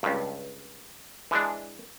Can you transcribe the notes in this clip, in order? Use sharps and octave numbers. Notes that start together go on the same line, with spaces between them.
C#2 G2
E3 G#3 D4